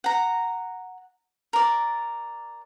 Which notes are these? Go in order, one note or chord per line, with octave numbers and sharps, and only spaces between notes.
F#5 A#5
A#4 D5